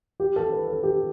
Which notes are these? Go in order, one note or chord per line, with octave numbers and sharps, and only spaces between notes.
G4
A4
B4
A4
G4